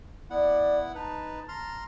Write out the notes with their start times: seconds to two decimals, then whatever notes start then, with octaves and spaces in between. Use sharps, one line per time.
0.30 B3 E4 D5 F#5
0.95 D#4 B4 A5
1.49 A#5 C6 F6